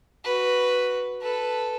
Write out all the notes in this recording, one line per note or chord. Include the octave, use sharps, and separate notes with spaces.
F#4 B4
A4 B4